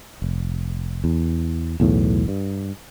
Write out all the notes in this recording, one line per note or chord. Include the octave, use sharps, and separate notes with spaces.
F1
E2
B1 E2 A2
G2